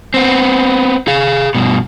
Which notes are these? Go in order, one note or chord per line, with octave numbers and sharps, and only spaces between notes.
B3 C4
G#4 F5
G2 B2